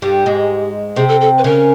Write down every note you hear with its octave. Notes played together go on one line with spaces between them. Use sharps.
G2 G3 G4
G#2 G#3
C3 C4 G#4
A4
A4
B4
C#3 C#4 A#4